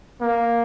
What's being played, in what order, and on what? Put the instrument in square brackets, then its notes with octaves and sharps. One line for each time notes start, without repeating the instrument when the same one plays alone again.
[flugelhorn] A#3